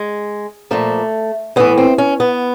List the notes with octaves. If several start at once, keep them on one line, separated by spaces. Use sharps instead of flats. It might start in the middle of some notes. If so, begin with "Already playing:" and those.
Already playing: G#3
A#2 F3 A3
A2 E3 B3
C4
C#4
B3